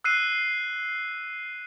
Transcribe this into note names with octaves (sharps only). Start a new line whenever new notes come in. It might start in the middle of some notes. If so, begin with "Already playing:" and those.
E6 F#6 C7 D#7